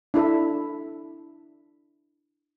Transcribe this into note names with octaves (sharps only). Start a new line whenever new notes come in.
D4 E4 A4 E5